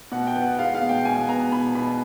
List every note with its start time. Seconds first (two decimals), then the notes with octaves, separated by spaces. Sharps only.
0.12 B2 F#5
0.27 G5
0.36 B3
0.43 F#5
0.59 G#3 F5
0.75 F5
0.82 B2
0.89 G5
1.05 B2 G#5
1.29 B3 A#5
1.52 B2 B5
1.75 B2 B5